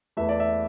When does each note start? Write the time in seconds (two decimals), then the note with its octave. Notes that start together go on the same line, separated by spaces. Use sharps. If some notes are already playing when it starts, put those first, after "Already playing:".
0.17 E2 E3 A3 E5
0.29 D5
0.40 E5